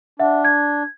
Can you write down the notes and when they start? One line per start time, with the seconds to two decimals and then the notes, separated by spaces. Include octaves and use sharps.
0.19 D4 E5 F#5
0.45 G#6